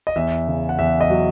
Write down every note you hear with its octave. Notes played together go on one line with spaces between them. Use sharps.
D#5
E2 E5
C#3
F#5
E2 E5
D#5
F#3